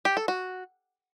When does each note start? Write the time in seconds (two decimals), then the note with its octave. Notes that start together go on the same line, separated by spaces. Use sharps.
0.05 G4
0.17 A4
0.28 F#4